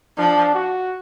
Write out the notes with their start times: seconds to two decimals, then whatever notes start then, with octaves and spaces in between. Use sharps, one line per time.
0.18 F3 D4
0.54 F#4